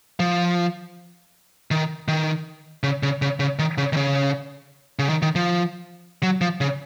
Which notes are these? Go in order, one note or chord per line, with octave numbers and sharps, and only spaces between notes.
F3
D#3
D#3
C#3
C#3
C#3
C#3
D#3
C#3
D#3
C#3
C#3
D#3
D#3
F3
F#3
F3
C#3